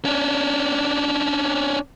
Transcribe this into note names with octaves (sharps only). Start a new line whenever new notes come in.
C#4 D4